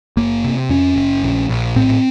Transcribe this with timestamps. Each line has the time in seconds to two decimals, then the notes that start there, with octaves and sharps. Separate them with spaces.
0.17 F#1 A#3
0.44 C3
0.69 F2 C#4
0.96 F#1
1.23 A#1
1.49 A#1
1.76 A2 C4